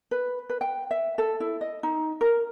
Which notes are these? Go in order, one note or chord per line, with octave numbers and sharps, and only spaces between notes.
B4
B4
G5
E5
A4
E4
D#5
D#4
A#4